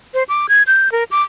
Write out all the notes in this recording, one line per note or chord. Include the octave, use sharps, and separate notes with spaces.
C5
D6
G#6
G6
A#4
D6